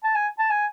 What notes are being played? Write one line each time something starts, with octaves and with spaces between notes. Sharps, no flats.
A5
G#5
A5
G#5